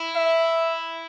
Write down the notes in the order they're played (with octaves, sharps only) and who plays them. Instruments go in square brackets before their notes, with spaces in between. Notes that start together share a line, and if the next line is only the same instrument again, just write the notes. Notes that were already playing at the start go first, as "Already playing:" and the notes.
Already playing: [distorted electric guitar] E4
[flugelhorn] E5